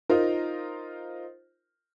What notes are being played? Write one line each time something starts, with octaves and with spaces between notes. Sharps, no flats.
D#4 F4 A#4 C5